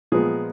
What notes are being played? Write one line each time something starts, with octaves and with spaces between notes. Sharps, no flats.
A#2 F3 G#3 B3 G#4